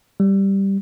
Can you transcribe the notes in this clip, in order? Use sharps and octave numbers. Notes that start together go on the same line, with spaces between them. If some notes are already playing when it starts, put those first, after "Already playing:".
G3